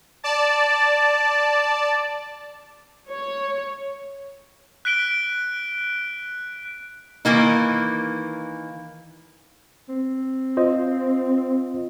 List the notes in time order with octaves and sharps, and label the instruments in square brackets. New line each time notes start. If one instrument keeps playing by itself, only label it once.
[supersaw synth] D5 A5
[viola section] C#5
[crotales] F#6 B6 D7 G7
[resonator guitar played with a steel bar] D#3 E3 A#3 D#4
[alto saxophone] C4
[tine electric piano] F4 C5 D#5